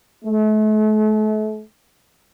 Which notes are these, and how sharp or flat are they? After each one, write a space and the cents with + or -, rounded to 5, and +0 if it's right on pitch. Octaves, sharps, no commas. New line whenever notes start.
A3 -40